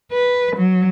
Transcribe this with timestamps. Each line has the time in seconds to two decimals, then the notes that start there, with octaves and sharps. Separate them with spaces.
0.12 B4
0.56 F#3